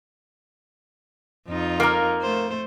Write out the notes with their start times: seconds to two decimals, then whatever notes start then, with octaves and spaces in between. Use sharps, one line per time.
1.47 F2 D#4 F4
1.80 A#3 A#4
2.22 A3 C5